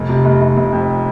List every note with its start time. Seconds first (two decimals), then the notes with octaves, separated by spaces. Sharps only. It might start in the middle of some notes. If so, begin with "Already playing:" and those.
Already playing: F1
0.09 C3
0.25 F1
0.41 F1
0.57 F1
0.72 F2